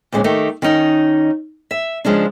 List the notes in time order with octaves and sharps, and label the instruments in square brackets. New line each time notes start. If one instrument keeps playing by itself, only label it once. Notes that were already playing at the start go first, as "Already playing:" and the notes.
[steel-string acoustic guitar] D2 A#2 G#3 B3 C#4
D#3 A3 D#4 G4
D#3 C#4 D#4
E5
C#3 F3 G#3 C#4 D4